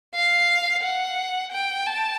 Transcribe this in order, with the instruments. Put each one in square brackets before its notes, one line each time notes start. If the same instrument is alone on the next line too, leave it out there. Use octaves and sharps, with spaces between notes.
[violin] F5
F#5
G5
A5